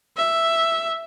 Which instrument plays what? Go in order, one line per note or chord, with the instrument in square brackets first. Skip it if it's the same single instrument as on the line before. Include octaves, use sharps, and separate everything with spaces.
[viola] E5